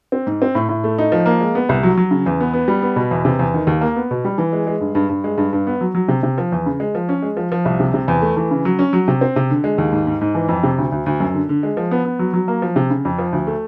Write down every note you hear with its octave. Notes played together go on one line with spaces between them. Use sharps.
C4
G#2
C4
A2
A2
A3
D#4
F3
A#3
G#3
B3
C2
F#3
F#3
C#3
E2
B3
B3
G3
B3
B2
E2
C3
E2
D#3
D#2
A#3
B3
B2
G3
E3
G#3
G#3
G2
G2
G2
G#3
G2
G2
B3
F#3
F#3
C3
C3
F3
E2
C#3
G#3
F3
C#4
G#3
F3
F3
C2
C3
C3
E2
A3
E3
C#3
F#3
C#4
F#3
C3
C4
C3
D3
G#3
D#2
G#2
G#2
G#2
E3
F2
C3
D2
D2
D2
F#2
D3
D3
G#3
F3
B3
B3
F#3
F#3
A#3
F3
C3
C#3
F2
F3
D2
A3